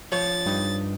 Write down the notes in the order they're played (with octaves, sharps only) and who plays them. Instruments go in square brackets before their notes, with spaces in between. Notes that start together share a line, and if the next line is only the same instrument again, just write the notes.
[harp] F3 [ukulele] C#5 [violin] A6
[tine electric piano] G2 [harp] D#4